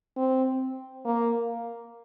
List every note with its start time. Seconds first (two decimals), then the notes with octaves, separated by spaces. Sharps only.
0.17 C4
1.05 A#3